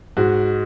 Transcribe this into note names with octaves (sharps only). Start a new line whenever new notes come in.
G#2 F#4